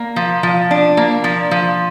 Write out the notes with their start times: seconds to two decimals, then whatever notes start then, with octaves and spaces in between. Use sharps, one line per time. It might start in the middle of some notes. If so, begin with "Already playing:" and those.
Already playing: A#3
0.16 F3
0.43 F3
0.71 D4
0.97 A#3
1.24 F3
1.51 F3